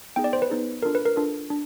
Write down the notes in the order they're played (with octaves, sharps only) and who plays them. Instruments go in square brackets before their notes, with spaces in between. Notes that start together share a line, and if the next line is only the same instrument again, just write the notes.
[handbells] B3 D#4 G#4 G5
D5
C5
B4
B3 D#4 G#4
D4 F4 A4 A#4
B4
A#4
D4 F4 A4
D4